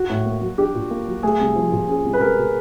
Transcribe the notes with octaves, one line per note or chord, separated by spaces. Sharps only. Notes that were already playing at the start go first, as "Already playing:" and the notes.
Already playing: F#4
A2
A#3
F#3
D4 G4
A#2
A#3
F#3
A3 G#4
C2
F3
A#2
C#4 G#4
C2
B4
G#3 A#4
B2